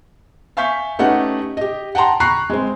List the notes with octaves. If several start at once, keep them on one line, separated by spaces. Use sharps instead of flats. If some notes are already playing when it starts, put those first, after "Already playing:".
E5 F5 G#5 C#6 G6 B6
A3 C#4 D#4 G4 B4 F#5
G4 D#5
F#5 G5 A5 A#5 C6
A#5 B5 C#6 F#6 C7
G#3 C4